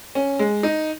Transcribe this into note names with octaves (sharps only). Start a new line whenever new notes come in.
C#4
G#3
D#4